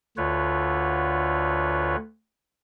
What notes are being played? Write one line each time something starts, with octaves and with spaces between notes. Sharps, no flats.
D2 D3 F4 B4 C#5